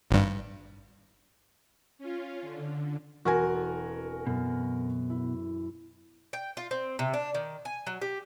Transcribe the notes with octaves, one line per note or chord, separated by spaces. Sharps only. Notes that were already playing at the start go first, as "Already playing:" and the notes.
G#1 G2
C#4 F4
D3
E1 C4 F#4 A#4 G#5 A#5
A4
F#2 B2 F6
E4
G5
F4
C4
C3
D4
D#3
G#5
F#3
G4